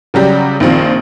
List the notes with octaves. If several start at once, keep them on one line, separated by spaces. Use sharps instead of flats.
C#3 F#3 G3 G4
A#1 D#3 C4 F4